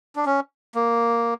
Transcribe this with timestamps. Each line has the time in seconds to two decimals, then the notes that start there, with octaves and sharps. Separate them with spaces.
0.16 D4
0.26 C#4
0.75 A#3